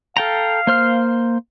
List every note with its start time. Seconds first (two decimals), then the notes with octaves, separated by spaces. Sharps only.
0.17 A4 F5 G5 A#5
0.67 A#3 C5 F6